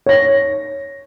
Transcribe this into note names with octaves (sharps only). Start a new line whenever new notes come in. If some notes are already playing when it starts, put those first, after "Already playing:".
C#5 A#6